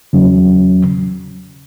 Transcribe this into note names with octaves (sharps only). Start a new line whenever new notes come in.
E2 C#3 F#3 C#4